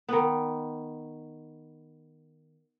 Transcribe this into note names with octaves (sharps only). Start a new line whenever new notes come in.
D#3 B3